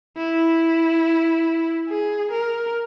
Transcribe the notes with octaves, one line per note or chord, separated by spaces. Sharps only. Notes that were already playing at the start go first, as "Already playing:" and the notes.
E4
G#4
A#4